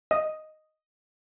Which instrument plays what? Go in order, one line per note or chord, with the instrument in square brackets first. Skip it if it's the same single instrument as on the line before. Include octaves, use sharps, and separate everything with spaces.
[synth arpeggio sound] D#5